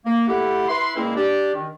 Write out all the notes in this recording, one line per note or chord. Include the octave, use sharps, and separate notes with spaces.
A#3
A3 E4 G4 F#5
E4 B4 C6
A#2 G#3 A#3 C4 C#4 E4
D4 G4
D#3